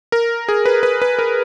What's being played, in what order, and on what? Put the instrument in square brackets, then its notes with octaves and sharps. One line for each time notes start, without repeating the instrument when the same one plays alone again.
[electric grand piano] A#4
G#4
B4
B4
B4
A#4